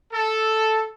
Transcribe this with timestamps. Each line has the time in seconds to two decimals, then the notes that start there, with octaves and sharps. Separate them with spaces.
0.13 A4